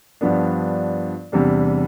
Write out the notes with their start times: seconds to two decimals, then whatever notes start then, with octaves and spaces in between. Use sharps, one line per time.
0.21 G2 F3 B3 D4
1.32 E2 C3 G3 D4